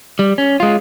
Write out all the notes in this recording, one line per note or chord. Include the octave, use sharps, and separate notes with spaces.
G3
C#4
G#3 F4